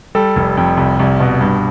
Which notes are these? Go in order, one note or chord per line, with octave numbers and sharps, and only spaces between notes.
G3 A4
F1
F2
C2
C2
B2
G2